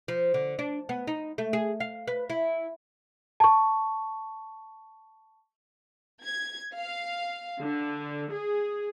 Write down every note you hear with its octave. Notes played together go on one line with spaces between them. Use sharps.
F3
D3
D4
B3
D#4
A3
G#4
F5
B4
E4
A5 C#6
G#6
F5
D3
G#4